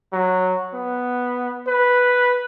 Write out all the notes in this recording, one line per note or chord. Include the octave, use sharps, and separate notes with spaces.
F#3
B3
B4